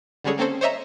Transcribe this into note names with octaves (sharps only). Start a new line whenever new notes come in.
D3 G3 G#3 C#4 G#4 A4
A#3 C4 C#4 A4 C5
C5 C#5 D#5 E5 A#5